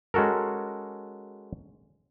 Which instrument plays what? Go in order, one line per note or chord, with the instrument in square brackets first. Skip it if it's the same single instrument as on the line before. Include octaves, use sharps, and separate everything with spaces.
[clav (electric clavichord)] G#3 C#4 F#4 A4 A#4